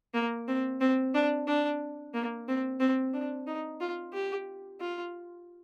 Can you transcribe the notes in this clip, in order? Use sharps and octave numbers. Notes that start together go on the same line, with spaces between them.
A#3
C4
C4
D4
D4
A#3
C4
C4
D4
D#4
F4
G4
F4